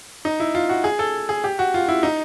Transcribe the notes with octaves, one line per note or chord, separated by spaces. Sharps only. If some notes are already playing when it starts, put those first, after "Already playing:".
D#4
E4
F4
F#4
G#4
A4
G#4
G4
F#4
F4
E4
D#4